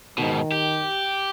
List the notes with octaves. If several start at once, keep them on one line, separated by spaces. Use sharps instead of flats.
G#2 B2 D#3
G4